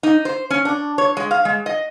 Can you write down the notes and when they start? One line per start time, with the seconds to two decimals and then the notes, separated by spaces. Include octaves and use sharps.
0.03 D#4
0.25 C5
0.50 C#4
0.65 D4
0.98 C#5
1.17 G#3
1.31 F5
1.45 G#3
1.66 D#5